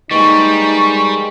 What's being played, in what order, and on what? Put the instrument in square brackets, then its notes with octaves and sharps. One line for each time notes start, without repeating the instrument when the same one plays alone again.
[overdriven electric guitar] G3 [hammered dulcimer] G#3 A#3 B4 [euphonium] D#4 [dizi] C#6